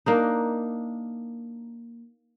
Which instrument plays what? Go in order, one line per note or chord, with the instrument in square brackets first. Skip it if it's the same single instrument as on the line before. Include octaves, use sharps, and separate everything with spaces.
[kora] A#3 D4 D#4